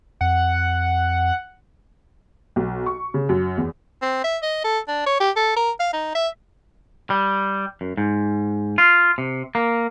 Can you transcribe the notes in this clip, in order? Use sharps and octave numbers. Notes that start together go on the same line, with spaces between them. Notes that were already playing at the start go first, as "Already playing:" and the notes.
F2 F#5
B1
C#6
C#3
F#2
E2
C4
E5
D#5
A4
D4
C#5
G4
A4
A#4
F5
D#4
E5
G3
F#2
G#2
F4
C3
A#3